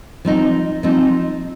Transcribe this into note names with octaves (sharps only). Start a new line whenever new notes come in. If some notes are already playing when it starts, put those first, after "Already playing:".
F3 C4 D#4
F3 C4 D#4